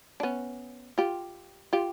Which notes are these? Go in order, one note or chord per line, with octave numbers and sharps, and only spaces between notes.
D4
B3 C#4
F4 G4
F4 G4